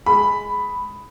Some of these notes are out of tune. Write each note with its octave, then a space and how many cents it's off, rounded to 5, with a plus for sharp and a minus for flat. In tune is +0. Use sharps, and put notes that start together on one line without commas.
G#3 +5 B5 +5